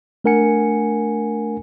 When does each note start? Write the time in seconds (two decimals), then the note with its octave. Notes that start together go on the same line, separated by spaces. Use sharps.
0.24 A3 D4 A#4 F#5 G#5 C#7